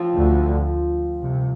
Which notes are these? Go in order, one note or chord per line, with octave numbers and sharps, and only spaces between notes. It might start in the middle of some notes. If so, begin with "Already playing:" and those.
Already playing: F3 C4 F4
D2 D3
C2 C3